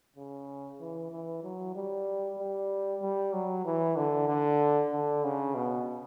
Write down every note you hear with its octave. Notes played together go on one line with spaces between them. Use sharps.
C#3
E3
E3
F#3
G3
G3
G3
F#3
E3
D3
D3
D3
C#3
B2